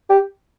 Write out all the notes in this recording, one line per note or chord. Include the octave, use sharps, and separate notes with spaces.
G4